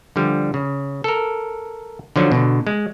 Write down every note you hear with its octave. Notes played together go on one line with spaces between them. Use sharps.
D3 F3 G3
C#3
A4 A#4
D3 F3 F#3 D#4
B2 D3
G#3